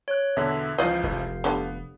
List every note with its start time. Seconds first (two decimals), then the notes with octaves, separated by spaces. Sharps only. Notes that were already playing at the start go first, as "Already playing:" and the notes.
0.08 C#5 F#6
0.37 E2 B2 D3 E5
0.78 C#2 E3 F3 D5 D#5 F5 G6
1.03 F1
1.44 D3 G3 B3